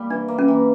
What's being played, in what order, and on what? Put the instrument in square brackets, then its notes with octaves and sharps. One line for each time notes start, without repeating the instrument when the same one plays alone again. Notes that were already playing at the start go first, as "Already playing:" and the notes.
Already playing: [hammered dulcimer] G3 A#3
[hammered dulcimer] E3 [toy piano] D4
[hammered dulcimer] A#3
[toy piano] C#4
[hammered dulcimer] E3